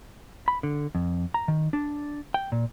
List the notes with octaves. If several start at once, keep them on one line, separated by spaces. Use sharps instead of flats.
B5
D3
F2
A#5
D#3
D4
G5
A#2